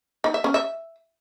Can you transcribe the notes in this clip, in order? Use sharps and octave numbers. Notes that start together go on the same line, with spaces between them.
D#4
E5
C#4
E5